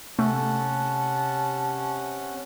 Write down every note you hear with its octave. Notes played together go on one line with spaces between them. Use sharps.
C3 A3 C#4 F#5 A5